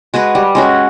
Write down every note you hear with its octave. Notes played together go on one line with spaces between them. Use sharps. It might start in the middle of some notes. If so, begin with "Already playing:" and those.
G#3 F#4 G#4 B4
G3
G#3 C#4 F#4